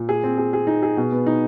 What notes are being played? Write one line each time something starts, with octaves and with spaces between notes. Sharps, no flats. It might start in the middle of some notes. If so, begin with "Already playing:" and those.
Already playing: A#2
G#4
C4
G#4
G#4
D#4
G#4
B2
B3
D#4